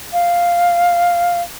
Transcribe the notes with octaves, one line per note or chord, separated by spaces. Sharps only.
F5